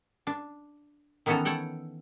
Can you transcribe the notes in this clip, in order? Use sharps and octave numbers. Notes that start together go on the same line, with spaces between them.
D4
D#3 E3 B3 C#4 A4 A#5
A4 C#5 F#5 G5